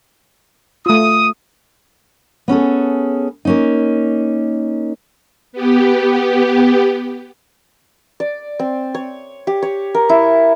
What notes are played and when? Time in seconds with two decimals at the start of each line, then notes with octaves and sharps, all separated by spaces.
0.86 A3 F4 D#6
2.48 B3 C#4 G#4 A4
3.45 A#3 C#4 D#4
5.53 B3 G4
8.20 D5
8.59 C4
8.95 C#5
9.47 G4
9.62 C#5
9.94 A#4
10.09 E4